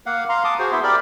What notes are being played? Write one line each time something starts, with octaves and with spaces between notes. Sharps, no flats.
A#3 F5 F#5
F5 A#5 C6
A5 D6 D#6
F#4 G#4 C5
B3 E4 E5 C6
G4 A#4 D5 B5